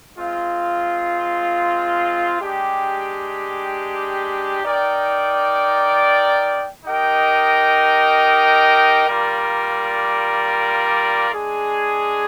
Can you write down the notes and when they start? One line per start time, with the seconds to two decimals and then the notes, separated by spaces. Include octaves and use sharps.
0.18 G#3 C4 F4
2.40 G#3 D4 G4
4.63 D#4 A#4 D5 G5
6.85 D#4 G4 A#4 D#5 G5
9.08 G3 A#3 F4 A#4 D5
11.30 G#3 D4 G#4